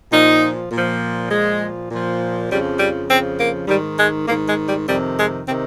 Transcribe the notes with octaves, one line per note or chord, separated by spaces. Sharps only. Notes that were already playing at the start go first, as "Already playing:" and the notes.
A#2 F3 D#4
A#2
F3
A#2 F3 G#3
A#2 F3
F2 C#3 F3 G3
G3
F2 C#3 F3 C4
A#3
G#2 D#3 G3
G#3
G#2 D#3 A#3
G#3
G3
F2 C3 D#3 G3
G#3
C3 D#3 C4